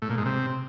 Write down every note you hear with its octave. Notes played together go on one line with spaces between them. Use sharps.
A2
A#2
G#2
C3